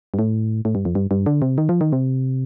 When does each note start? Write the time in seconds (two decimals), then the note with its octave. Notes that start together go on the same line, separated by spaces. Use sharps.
0.14 G2
0.19 A2
0.65 A2
0.75 G2
0.85 F2
0.95 G2
1.11 G2
1.26 D3
1.42 C3
1.58 D#3
1.69 F3
1.81 D#3
1.92 C3